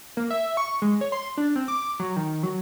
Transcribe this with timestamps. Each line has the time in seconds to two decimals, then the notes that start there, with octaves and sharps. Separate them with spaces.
0.17 A#3
0.30 E5
0.57 C#6
0.82 G#3
1.01 C#5
1.12 C6
1.37 D4
1.56 C4
1.68 D6
1.99 F#3
2.16 D#3
2.43 F#3